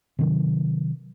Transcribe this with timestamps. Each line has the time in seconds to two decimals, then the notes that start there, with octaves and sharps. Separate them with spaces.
0.19 C3 D#3 F#3